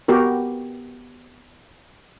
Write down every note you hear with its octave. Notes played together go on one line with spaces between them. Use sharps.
B3 F#4 G4 A#4